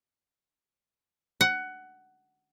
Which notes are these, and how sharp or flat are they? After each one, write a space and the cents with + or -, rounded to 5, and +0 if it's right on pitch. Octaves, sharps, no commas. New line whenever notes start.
F#5 +15